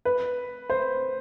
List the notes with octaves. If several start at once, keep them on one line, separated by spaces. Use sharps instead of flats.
B4
C5